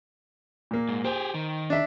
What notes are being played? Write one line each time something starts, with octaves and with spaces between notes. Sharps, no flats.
A#2 A#3
G#2
G4 G#4 C5
D#3
D4 E5